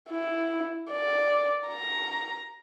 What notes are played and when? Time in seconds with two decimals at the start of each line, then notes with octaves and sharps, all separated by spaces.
0.11 E4
0.91 D5
1.68 A#5